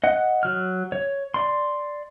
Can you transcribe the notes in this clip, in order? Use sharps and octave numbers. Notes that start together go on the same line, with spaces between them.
D#5 F#5
F#3 F6
C#5
D5 C6